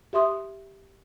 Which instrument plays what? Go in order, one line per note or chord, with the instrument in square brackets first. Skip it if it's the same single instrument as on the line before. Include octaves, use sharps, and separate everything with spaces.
[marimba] G4 E5 C6 D#6